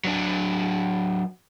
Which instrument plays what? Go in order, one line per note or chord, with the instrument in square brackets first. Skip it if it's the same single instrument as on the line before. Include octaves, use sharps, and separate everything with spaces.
[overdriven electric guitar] F#3 D4